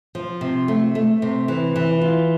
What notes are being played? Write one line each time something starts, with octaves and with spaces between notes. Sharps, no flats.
F3
C3
A3
A3
C3
E3
E3
F4